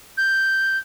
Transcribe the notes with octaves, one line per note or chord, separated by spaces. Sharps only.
G6